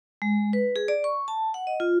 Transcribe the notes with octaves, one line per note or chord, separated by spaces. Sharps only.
G#3
B4
G#4
D5
C#6
A5
F#5
D#5
F4